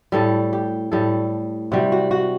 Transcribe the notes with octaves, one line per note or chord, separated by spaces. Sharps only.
A2 G3 A4
G4
A2 G3 A4
C3 G3 F#4
F#4
F#4